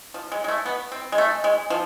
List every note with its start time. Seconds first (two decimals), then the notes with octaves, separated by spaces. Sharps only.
0.14 F3
0.32 G#3
0.44 G#3
0.48 A3
0.66 B3
0.92 C4
1.12 G#3
1.18 A3
1.44 G#3
1.70 F3